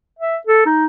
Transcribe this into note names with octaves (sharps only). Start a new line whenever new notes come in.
E5
A4
D#4